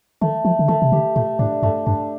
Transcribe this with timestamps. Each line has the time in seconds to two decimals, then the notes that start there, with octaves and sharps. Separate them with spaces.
0.21 D#3 A3
0.45 F3 A3
0.59 D3
0.68 D#3 A3
0.82 C3
0.92 D3 G4
1.16 A#2 A3
1.39 A2 D4
1.62 G2 A3
1.86 G2 D4